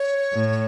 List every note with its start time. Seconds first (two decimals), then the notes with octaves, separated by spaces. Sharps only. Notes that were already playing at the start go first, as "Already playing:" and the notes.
Already playing: C#5
0.33 A2